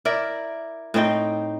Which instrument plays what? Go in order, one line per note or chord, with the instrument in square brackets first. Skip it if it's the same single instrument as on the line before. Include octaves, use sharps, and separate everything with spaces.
[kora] E4 A#4 D5
A2 C4 D#4 G5